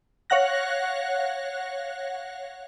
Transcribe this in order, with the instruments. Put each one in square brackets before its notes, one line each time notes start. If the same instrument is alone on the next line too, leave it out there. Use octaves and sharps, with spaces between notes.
[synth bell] C#5 F5 F#5 F#6 A#6